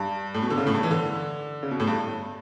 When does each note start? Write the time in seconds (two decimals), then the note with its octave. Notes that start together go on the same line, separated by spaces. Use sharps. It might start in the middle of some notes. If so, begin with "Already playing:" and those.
Already playing: G2
0.34 A2
0.42 B2
0.50 D3
0.58 C#3
0.67 A2
0.74 G2
0.83 E3
0.91 D3
1.63 C#3
1.71 B2
1.80 A2
1.87 G2